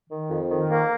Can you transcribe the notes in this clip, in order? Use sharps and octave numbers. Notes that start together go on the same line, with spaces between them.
D#3
F2
D#3
A#3